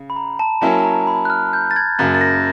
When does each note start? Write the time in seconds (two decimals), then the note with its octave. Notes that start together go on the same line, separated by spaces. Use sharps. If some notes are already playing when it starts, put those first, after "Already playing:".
Already playing: C#3
0.10 B5
0.16 A#5
0.39 A5
0.61 F#3 A#3 C#4 E4 A5
0.79 A5
0.84 A#5
1.07 B5
1.25 F#6
1.30 F6
1.53 G6
1.71 A6
1.76 G#6
1.99 F#2 C#3 F#3 A#3 A6
2.15 A6
2.21 A#6